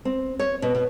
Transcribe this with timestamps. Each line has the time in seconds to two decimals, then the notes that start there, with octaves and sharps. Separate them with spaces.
0.05 C4
0.39 C#5
0.62 B2
0.75 B2